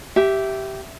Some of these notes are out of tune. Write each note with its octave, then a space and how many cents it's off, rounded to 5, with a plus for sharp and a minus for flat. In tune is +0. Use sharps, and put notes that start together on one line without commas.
G4 -15 E5 +0